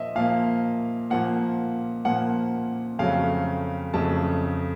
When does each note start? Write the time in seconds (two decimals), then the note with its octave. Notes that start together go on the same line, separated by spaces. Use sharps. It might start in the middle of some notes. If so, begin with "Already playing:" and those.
Already playing: A#2 F3 A#3 D#5 E5
0.15 A#2 F3 A#3 F5
1.10 A#2 F3 A#3 F#5
2.05 A#2 F3 A#3 F#5
2.99 F2 C#3 F#3 A3 F5
3.94 F2 C#3 F#3 A3 A5